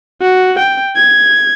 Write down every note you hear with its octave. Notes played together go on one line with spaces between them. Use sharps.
F#4
G5
G#6